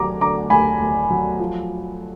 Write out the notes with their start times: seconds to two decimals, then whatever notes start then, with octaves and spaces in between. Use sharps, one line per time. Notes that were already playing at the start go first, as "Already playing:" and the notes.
Already playing: D2 F#3 A#5 D6
0.21 D3 A#5 D6
0.50 D2 G#5 B5
0.80 D2
1.11 F#3
1.39 F3